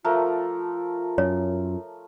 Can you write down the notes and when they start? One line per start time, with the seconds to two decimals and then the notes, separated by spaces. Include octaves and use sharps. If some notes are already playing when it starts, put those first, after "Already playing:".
0.04 F3 A3 F4 A#4
1.18 F#2 C#5